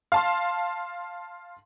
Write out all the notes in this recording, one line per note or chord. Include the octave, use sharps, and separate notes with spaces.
F5 A5 C6